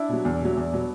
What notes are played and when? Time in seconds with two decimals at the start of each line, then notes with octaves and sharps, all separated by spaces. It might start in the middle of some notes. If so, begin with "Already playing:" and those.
Already playing: D4 E4
0.09 B2 F#3
0.25 E2
0.40 B2 F#3
0.57 E2
0.73 B2 F#3